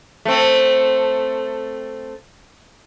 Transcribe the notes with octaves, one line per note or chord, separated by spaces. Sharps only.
A3 C4